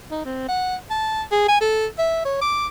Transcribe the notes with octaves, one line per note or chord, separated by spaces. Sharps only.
D#4
C4
F#5
A5
G#4
G#5
A4
E5
C#5
D6